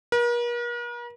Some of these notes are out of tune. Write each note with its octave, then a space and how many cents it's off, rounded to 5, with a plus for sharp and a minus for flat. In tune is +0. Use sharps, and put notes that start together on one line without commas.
A#4 +45